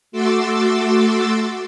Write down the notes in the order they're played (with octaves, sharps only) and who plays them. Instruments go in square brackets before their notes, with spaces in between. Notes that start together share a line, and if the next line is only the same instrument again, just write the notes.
[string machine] A3 F#4 C6 D6 E6 A6